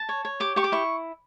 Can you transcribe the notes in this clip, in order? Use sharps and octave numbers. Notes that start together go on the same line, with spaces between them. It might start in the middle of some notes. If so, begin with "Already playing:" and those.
Already playing: A5
C#5
C#5
G4 D6
G4 C#6
D6
E4 C#6